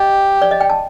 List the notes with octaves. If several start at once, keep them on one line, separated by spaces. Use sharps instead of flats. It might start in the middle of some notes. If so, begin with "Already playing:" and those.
Already playing: G4 D#5
D5
D#5
G5
A5